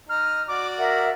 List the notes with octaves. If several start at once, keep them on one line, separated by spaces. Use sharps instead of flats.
D#4 F6
F#4 D5 D6
A#4 E5 F#5